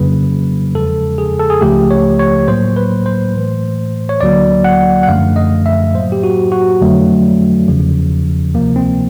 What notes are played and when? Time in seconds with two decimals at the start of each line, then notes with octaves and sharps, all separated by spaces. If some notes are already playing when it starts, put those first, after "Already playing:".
Already playing: F2 C#3 F#3 A#3 B4
0.75 E2 C#3 F3 G#3 A4
1.18 G#4
1.39 A4
1.50 G#4
1.61 C#2 C#3 F3 A3 G4
1.91 C#5
2.19 C#5
2.48 A2 F#3 A#3 C5
2.76 B4
3.06 C5
3.35 A2 E3 A3
4.09 C#5
4.21 D2 D3 F#3 A#3 D5
4.64 F#5
5.03 F#5
5.07 F#2 D3 F3 A3 F5
5.36 D#5
5.66 E5
5.94 A2 F#3 A#3 C5
6.12 G4
6.23 F#4
6.52 F#4
6.81 F2 D3 F#3 A3
7.68 E2 C#3 F3
8.54 D2 C3 F3 A#3
8.76 C4